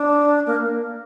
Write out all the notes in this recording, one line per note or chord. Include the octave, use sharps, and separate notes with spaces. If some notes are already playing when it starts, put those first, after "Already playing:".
Already playing: D4
A#3